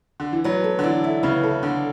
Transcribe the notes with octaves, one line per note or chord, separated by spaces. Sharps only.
D3
E3
F#3 B3
A4
D3
E3 D5
E4
C#3 B3
A4
D3 D5